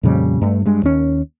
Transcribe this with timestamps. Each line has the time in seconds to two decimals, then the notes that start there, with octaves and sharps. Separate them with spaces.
0.03 F2 A#2 C#3 G3
0.41 G2 A3
0.66 G2 G#3
0.83 D#2 C#4